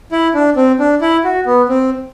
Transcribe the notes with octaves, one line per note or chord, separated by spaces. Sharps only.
E4
D4
C4
D4
E4
F#4
B3
C4